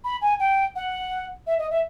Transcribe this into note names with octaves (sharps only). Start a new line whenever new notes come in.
B5
G#5
G5
F#5
E5
D#5
E5